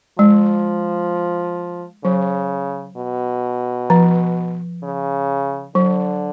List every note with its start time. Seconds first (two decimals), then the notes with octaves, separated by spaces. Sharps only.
0.18 F3 G#3
2.04 C#3 F#3
2.97 B2
3.90 F3
4.83 C#3
5.75 D3 F#3